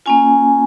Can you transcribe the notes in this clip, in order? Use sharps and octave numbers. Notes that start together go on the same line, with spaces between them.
A#3 C#4 F4 G#5